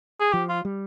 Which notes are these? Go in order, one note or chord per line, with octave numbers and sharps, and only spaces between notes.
G#4
F3 G4
F4
G3